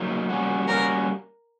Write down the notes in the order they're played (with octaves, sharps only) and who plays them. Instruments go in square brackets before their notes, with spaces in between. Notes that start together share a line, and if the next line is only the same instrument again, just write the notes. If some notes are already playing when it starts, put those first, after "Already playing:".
Already playing: [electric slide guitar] F#3 A#3 D#4
G3 A#3 C#4 F#4
[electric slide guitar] G3 A#3 C#4 F#4 [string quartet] A#4